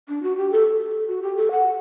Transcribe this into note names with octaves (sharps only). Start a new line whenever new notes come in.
D4
F#4
G4
A4
A4
F#4
G4
A4
F#5